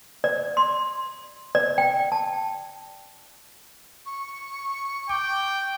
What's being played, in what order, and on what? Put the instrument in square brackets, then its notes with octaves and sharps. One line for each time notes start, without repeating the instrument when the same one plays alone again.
[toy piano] D5
C6
D5
G5
A5
[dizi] C#6
[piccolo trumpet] G5 [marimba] D6